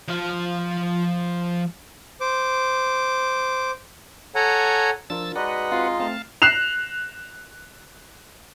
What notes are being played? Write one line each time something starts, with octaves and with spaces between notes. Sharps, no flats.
F3 F5
C5 D6
A4 C#5 F#5 G#5 A#5
F3 D4 F4 A#4 E6 A6
G#3 D#4 F#4 B4 D5 D#5 F#5
C4 F4
A3 C4 F5 A5
F#6 C7 E7 F7